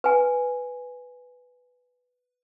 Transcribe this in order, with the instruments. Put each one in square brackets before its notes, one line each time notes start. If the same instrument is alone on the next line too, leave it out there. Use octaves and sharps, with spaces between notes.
[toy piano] B4 G#5